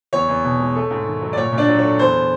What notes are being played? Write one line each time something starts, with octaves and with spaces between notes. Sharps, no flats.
E2 C#5
E2
B2
G#3
A3
G#2
D#3
F#3
D5
A#2 C#5
A#2
D4 D5
F#3
A3 C#5
E2 C5